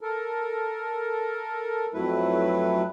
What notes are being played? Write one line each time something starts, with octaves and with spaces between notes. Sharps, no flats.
A4 A#4
F2 F#3 A3 E4 B4